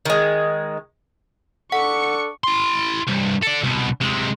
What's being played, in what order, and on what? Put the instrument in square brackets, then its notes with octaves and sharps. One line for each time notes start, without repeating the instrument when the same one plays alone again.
[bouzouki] D#3 G#3
[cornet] D4 [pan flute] A4 [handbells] F#5 [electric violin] C#6 C#7
[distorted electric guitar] E4 C6
C2 G2
A4 D5
C2 B2
C3 G#3